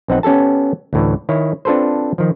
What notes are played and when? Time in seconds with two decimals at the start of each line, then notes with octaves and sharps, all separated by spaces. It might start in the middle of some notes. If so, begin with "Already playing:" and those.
0.08 B1 C4 D#4 F#5
0.23 B3 C#4 G4 A4 A5
0.93 D2 A2 E3
1.29 D#3 E4 C#5
1.65 C4 D4 F4 A4 B4 C5
2.18 D#3 F3